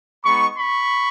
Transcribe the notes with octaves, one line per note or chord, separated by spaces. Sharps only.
G#3 B3 D#4 B5 C#6
B5 C#6